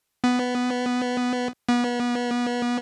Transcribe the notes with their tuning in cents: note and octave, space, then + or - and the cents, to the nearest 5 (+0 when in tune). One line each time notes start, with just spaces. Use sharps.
B3 +5
B3 -30